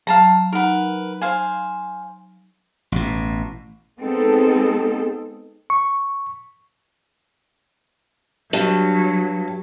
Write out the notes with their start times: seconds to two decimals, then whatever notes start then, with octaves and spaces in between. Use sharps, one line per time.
0.07 F#3 F5 A5 A#5
0.52 D#4 A#4 B4 F#5
1.21 C5 F5 G#5
2.92 A1 B2
4.01 G#3 B3 C4 D#4 G#4 A4
5.70 C#6
8.53 G2 F#3